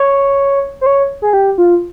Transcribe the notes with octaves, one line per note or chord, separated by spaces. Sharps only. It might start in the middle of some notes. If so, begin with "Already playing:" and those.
Already playing: C#5
C5
C#5
G#4
G4
F4